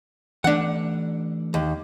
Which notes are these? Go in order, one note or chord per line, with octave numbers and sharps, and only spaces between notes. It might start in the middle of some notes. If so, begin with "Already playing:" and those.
E3 A3 D4 F#5
D#2